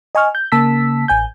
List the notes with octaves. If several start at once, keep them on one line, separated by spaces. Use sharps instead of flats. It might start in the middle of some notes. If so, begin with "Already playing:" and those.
D#5 G#5 C#6 F6
G6
C#3 A#3 A5 E6 B6
A1 G#5 G6